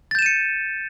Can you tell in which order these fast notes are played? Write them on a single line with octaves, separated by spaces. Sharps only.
A6 G6 E7 D#7 C#7